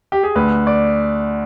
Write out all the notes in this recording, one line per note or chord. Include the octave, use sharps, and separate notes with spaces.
G4
G#4
D2 B4
D5